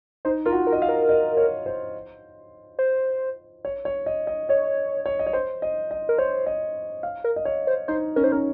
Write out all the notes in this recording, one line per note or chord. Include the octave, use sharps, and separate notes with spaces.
D#4 C5
F4 A#4
F#4
A#4
D#5
F5
A#4
D#5
C#5
C5
C5
C#5
C#5
D#5
D#5
C#5 D#5
C#5
D#5
C#5
C5
D#5
D#5
A#4
C5 C#5
D#5
F5
A#4
D#5
C#5
C5
D#4 C5
C#4 A#4
D#4 C5
C#4 A#4